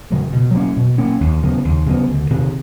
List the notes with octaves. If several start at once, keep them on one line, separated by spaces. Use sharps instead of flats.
C#3 F#3 A3
B2
F#3 A#3 C#4
B2
F#3 A#3 C#4
D#2
C#3 F#3 B3
D#2
C#3 F#3 B3
D2
C3 D#3